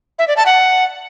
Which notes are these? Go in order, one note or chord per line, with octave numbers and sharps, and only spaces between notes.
E5
D5
A5
F#5